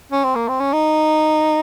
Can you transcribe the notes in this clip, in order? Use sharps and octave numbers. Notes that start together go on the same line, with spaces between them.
C#4
C4
A#3
C4
C#4
D#4